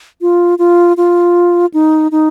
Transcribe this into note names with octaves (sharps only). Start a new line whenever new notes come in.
F4
F4
F4
D#4
D#4